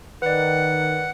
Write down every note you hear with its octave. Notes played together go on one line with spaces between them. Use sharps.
D#3 B4 D5 F#5